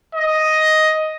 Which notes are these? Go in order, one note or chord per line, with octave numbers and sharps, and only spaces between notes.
D#5